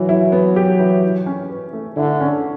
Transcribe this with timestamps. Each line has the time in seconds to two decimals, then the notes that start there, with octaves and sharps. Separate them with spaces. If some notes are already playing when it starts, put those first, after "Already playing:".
Already playing: E3 F#3
0.09 E4
0.32 B3
0.56 G4
0.79 E3
1.03 E4
1.26 C#4
1.50 B4
1.73 A3
1.97 D3 E4
2.20 C#4